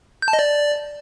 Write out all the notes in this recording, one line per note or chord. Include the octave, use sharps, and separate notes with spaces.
G6
A5
D#5
D5